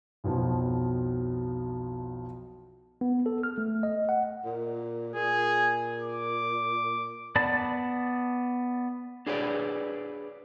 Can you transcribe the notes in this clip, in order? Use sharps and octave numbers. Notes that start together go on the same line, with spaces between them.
B1 F2 B2 F3
B3
A4
F6
A3
D#5
F#5
A#2
A#2 G#4
D6
B3 D5 A5
D4 G#4 B4 C#5 D5